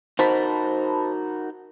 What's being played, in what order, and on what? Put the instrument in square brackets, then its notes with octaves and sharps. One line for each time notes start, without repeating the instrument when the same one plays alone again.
[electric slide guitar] D#4 F#4 A#4 [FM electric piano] C5 A5 B5